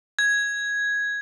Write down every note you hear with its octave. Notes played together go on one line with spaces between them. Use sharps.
G#6